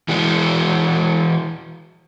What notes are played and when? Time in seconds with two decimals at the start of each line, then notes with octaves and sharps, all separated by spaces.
0.08 E3 G#3 F#4